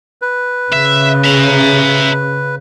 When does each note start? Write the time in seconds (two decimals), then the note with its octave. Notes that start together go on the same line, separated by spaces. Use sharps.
0.22 B4
0.73 C#3 E5
1.24 E5 A#5